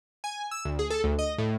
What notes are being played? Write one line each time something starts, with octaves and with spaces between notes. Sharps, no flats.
G#5
E6
D2
G#4
A4
D2
D#5
A2